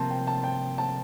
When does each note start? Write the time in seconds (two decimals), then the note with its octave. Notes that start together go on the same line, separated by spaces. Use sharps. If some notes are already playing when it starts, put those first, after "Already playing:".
Already playing: C3 F3 A#3 A5 C6
0.10 G5
0.27 A5
0.44 G5
0.78 A5